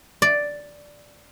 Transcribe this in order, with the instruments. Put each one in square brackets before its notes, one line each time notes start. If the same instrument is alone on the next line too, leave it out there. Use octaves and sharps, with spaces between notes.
[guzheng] D5